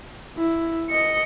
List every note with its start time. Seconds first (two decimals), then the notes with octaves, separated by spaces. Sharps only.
0.37 E4
0.90 D#5 C#7